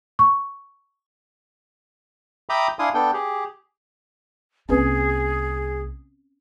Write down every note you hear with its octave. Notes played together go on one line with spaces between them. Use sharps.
C#6
E5 G5 A#5 B5 D6 D#6
D4 E4 F5 G#5 C6 D#6
B3 D4 A4 G5
G4 G#4
C2 A#3 C4 C#4 G#4 B4